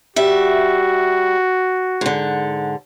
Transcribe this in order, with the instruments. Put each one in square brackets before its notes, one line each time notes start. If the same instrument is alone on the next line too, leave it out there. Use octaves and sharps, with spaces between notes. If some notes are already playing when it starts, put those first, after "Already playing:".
[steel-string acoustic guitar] G3 E5 [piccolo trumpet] F#4
[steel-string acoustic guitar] G#2 D3